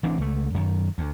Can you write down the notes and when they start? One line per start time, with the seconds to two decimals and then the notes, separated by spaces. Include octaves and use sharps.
0.03 A1 E3 C4 D4
0.18 C#2 A3
0.54 F#2 D#3
0.98 D2